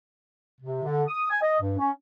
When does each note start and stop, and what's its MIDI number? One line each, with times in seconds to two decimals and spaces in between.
0.61 0.82 48
0.83 1.03 50
1.08 1.29 87
1.30 1.39 80
1.42 1.59 75
1.60 1.76 43
1.78 1.91 61